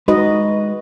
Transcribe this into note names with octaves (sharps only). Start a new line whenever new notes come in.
G#3 D#4 F#4 B4 D#5